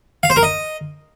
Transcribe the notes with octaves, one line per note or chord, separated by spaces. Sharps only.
F5
C5
A#4
D#5